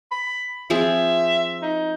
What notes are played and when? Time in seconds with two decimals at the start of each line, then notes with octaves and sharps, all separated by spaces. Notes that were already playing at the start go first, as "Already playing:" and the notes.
0.11 B5
0.70 F3 C4 G#4 E5
1.62 D#4